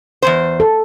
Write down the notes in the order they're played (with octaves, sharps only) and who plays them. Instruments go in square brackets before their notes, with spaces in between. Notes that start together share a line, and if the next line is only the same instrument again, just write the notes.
[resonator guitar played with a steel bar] E2 A#2 C5
[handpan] A4